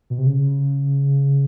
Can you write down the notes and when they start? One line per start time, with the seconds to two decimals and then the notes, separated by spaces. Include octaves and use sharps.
0.10 B2
0.18 C3
0.27 C#3